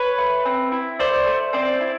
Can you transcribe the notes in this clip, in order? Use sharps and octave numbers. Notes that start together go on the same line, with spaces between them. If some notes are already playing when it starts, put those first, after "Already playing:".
Already playing: B4 C#5
A3
C4
E4
A3 C5 D5
A3
C4 C5 D5
E4